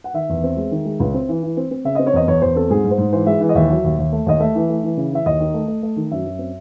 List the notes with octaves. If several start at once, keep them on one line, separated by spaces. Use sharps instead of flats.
F#5
D#3 E5
E2
C4
G#3
D#3
G#3
C#2
C4
E3
E3
C4
C4
C#3 E5
C4 D#5
C#5
E2 D#5
E2 C#5
E2 C5
C4 A4
G#2 G#4
G#2
C5
G#2
E3 C5
G#3 E5
E3
D#5
D#2 E5
F#3
D#2
D#2
A3
D#2 D#5
A3 E5
E3
A3
E3
C#3
E3 E5
D#2 D#5
D#3
A3
A3
A3
D#3
F#2 E5
F#2
C4